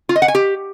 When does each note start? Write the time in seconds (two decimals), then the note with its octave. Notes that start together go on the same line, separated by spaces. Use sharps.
0.09 F4
0.16 D#5
0.22 F#5
0.28 G#5
0.35 G4